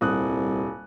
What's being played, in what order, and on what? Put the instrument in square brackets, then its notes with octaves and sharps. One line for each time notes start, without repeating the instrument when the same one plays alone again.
[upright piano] D#1 D#6 F#6 [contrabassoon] C2